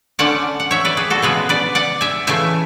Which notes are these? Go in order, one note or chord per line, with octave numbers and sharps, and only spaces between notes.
D3 A3 C#4 D5 F#5
F#5
C#5 E5
B4 D5
G#4 B4
F#4 A4
C#3 G#3 B3 G#4 B4
B4 D5
D5 F#5
E5 G#5
C#3 E3 A3 E5 G#5